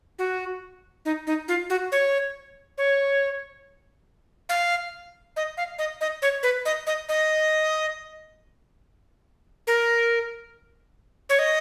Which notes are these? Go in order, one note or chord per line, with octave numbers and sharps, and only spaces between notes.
F#4
D#4
D#4
F4
F#4
C#5
C#5
F5
D#5
F5
D#5
D#5
C#5
B4
D#5
D#5
D#5
A#4
C#5
D#5